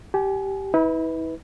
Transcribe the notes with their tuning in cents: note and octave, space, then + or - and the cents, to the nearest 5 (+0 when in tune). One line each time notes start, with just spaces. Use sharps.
G4 -10 G#5 +30
E4 -40 B4 +0